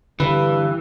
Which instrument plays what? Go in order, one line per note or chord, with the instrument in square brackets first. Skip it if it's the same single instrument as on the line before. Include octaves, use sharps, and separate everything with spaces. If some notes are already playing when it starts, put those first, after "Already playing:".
[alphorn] G2 [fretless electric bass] D3 [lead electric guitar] E3 [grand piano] B4